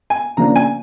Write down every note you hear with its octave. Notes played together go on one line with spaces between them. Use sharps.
G#5
C#3 F3 A#3 D4 A#5
G#5